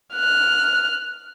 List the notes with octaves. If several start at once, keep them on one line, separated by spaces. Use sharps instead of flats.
F6 F#6